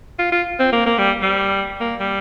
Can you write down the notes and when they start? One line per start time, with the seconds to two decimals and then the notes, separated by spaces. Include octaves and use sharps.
0.19 F4
0.32 F4
0.59 C4
0.73 A#3
0.86 A#3
0.98 G3
1.22 G3
1.80 A#3
2.00 G3